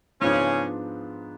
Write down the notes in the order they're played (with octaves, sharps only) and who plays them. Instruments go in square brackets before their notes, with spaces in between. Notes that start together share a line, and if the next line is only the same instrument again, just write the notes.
[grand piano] G#2 F3 G#3 B3 D4 [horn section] C#3 C#4